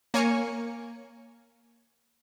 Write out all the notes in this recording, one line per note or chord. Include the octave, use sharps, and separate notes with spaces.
A#3 C#5 G#5 C#7